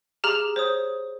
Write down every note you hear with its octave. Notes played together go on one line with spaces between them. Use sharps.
G4 G#4 A#5 F6 E7 F#7
C5 C#5 D#6